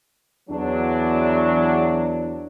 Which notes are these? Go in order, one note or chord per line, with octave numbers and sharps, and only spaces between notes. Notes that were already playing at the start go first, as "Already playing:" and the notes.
E2 F#3 D4